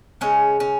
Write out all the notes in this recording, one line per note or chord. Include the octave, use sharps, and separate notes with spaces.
C#3 G#3 C#4
C#4